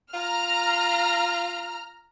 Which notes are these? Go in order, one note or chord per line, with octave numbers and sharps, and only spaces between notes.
F4 A#5 F6